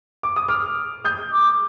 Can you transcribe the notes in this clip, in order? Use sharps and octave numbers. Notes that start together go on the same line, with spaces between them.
D6
D#6
D6 F6
D#6 G6
D6